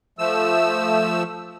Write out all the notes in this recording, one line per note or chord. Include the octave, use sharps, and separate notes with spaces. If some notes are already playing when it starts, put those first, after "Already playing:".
F3 A3 E6